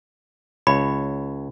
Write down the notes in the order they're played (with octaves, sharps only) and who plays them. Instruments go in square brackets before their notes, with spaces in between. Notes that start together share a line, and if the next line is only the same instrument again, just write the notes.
[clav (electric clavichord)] C#2 C#5 [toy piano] B5